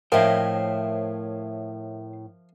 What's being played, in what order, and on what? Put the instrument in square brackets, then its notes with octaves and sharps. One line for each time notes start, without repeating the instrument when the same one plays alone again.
[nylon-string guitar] A2 D#5 [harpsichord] F3 [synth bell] A#4 E5 [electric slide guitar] C5 C#5 G5